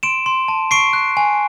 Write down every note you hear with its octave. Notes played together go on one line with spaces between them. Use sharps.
C6 D7 E7
C6
A5
C#6 C7 D7
F#6
G#5